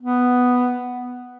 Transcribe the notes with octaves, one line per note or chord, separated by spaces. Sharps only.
B3